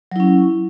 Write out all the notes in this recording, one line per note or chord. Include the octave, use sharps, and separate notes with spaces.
F#3 C#4 E4